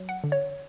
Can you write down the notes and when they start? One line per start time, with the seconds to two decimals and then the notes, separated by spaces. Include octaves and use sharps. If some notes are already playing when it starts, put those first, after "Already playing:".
Already playing: F#3
0.09 F#5
0.24 D3
0.32 C#5